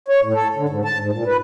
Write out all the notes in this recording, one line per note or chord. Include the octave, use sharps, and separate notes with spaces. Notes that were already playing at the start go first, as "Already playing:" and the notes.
C#5
A2
A4
D3
G#2
A5
G#2
A#2
B4